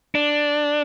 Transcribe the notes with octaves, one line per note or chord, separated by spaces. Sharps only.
D4